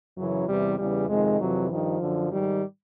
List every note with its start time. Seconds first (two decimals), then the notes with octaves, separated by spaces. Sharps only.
0.17 F#2 C#3 E3 F#3
0.48 E2 C3 E3 G3
0.79 E2 C#3 E3 G3
1.09 F2 C3 D#3 G#3
1.40 F2 C3 E3 F#3
1.71 G2 D#3 F3
2.02 F#2 D3
2.31 G#2 D#3 G3